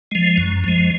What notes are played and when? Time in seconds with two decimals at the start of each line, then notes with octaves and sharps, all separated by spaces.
0.11 F3 G#3
0.37 F#2
0.64 F3 G#3